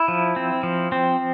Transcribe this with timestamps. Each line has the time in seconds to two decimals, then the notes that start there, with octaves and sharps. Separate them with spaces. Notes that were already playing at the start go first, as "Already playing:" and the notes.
Already playing: E4
0.08 F3
0.36 C4
0.63 F3
0.92 C4